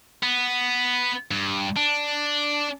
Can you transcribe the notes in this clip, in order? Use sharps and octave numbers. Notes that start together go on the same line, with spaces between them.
B3
G2
D4